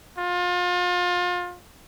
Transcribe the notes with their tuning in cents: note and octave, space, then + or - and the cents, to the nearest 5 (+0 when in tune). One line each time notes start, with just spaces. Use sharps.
F4 +30